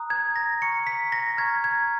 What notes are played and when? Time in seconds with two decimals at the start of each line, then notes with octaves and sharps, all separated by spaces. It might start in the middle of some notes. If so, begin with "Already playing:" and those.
Already playing: A#5 D#6 F#6
0.10 G#6
0.36 A#6
0.62 A#5 C#6 F6 C#7
0.87 B6
1.12 A#6
1.37 A#5 C#6 F6 G#6
1.64 G#6